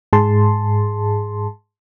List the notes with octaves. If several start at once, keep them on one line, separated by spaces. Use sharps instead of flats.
G#2 G#4 A5 C6